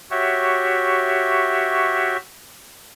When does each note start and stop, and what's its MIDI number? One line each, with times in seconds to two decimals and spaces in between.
0.11 2.17 66
0.11 2.17 67
0.11 2.17 73
0.11 2.17 76